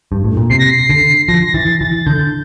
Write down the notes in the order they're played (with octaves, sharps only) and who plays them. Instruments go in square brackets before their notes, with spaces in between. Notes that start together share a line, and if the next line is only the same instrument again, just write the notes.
[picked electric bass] G2
A2
A#2
[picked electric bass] C3 [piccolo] C7
[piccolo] A#6
C7
[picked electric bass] D3
[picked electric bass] F3 [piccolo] A#6
[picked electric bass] E3 [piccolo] A6
[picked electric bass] E3 [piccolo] A6
[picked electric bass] D3 [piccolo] G6